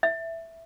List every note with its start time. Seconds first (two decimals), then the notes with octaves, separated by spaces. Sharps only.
0.03 E5